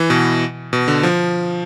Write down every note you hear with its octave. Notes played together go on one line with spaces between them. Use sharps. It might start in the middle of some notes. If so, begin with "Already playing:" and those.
Already playing: E3
B2
B2
D3
F3